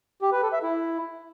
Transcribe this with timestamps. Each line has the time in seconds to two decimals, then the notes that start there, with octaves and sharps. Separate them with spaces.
0.22 G4
0.32 B4
0.42 A4
0.53 E5
0.63 E4